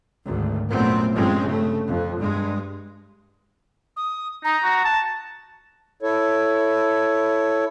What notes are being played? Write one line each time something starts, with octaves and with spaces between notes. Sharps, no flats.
G#1 D2
A#1 F#2 A#2 A3 B3 C4
G2 F3 G#3 C4 C#4
C#3 A3
F2
G2 G#3
D#6
D#4 A#5
F#4
A5
E4 A4 C#5